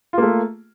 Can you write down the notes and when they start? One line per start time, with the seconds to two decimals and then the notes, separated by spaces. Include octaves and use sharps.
0.13 F4
0.18 A#3
0.23 A3